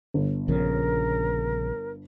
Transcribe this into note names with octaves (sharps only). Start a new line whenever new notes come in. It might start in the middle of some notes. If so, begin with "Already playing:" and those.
G1
A#1 C#3 F3 A#4